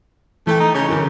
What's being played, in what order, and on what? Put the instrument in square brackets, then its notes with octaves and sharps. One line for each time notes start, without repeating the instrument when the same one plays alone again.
[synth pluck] E3 A4 G5 [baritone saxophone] A3
[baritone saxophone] D#4
[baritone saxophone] C#3 [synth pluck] C#6 G6
[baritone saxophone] F#2 [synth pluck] D3 E3